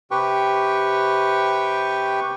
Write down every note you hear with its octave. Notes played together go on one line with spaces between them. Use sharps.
C3 G4 B4 G5 C#6